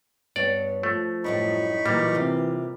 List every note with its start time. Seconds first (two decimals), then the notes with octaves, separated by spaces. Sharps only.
0.36 G2 B3 C#5 D5
0.83 F3 A3
1.24 F#2 A2 G3 D#4 B5 C#6
1.86 A#2 E3 F#3 G3 A#3
2.15 C3 F4